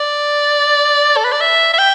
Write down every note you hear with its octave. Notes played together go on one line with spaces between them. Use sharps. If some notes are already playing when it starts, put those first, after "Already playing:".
Already playing: D5
A4
B4
D5
E5
E5
G5